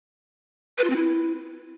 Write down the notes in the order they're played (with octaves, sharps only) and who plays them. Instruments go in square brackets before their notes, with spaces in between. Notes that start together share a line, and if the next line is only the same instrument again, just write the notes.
[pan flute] B4
F4
C4
E4